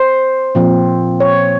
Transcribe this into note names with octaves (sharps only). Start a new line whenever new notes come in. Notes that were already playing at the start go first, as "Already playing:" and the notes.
Already playing: C5
A#2 F3 C4
C#5